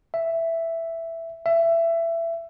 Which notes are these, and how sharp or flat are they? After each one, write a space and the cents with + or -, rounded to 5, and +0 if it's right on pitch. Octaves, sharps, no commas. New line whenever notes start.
E5 +5
E5 +20